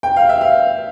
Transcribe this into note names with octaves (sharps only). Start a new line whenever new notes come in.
G5
F5
E5
F5